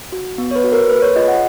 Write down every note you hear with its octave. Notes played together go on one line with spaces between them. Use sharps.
F#4
B3
C#5
B4
F#4
A#4
A#3 B4
C#5
F4 G#4 D#5
F#5